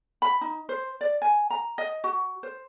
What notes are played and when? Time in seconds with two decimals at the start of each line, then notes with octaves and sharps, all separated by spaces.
0.22 B5
0.41 D#4
0.69 C5
1.01 D5
1.22 G#5
1.50 A#5
1.78 D#5
2.04 F#4
2.43 C5